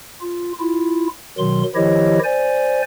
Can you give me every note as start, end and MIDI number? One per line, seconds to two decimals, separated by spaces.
0.21 0.52 65
0.60 1.07 64
0.60 1.07 65
1.38 1.63 47
1.38 1.63 51
1.38 1.63 54
1.38 1.63 84
1.75 2.19 51
1.75 2.19 53
1.75 2.19 64
1.75 2.19 67
1.75 2.19 73
1.75 2.19 75
2.24 2.82 72
2.24 2.82 74
2.24 2.82 80